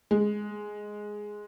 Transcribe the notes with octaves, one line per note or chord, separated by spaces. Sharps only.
G#3